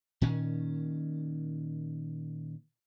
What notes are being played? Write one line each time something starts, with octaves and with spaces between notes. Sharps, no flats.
A#2 D#3 C#4